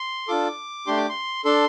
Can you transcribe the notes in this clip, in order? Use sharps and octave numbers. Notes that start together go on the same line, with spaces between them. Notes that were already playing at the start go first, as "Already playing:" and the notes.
Already playing: C6
D4 F4 A4 D6
A3 D4 G4 C6
D6
C6
D4 A4 C6